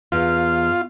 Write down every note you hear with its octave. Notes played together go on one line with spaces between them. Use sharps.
E2 F4